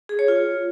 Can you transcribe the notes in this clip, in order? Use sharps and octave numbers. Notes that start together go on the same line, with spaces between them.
G#4
C#5
F4